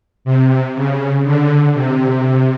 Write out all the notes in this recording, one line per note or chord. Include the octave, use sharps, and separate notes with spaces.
C3
C#3
D3
C3